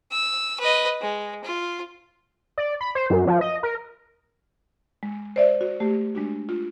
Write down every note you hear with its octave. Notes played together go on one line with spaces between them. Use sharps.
E6
B4 D#5
G#3
F4
D5
B5
C5
F#2
F3
D#5
A#4
G#3
C5 D5 E5
F#4
A3 G4
G#3 D4 F#4
F4